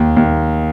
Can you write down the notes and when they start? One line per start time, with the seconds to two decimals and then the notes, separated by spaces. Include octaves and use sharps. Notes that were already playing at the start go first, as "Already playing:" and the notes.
Already playing: D#2
0.17 D#2